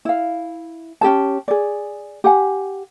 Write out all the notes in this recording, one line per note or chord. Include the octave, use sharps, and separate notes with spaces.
E4 F5
C#4 G4 G#4 A5
G#4 D5
G4 F#5 G#5